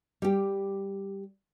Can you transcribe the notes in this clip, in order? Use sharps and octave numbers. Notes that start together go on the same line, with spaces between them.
G3 G4